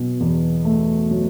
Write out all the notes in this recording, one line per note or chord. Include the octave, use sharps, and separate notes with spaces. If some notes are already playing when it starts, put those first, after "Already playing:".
Already playing: B2 F#3
E2
A3
F#3